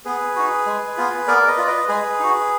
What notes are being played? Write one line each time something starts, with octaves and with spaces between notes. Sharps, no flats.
B3 G#4 B4
D#4 F#4
G#3
B3 F4
B3 A#4 D5
B4 D#5
F4 D5
B4 D#5
G#3 G#4 B4
D#4 F#4